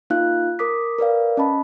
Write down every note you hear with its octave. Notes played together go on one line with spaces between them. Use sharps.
A#3 D#4 F4 F5 F#6
A#4 D6 D#6 B6
A#4 B4 D5 F5
C#4 D#5 A5 B5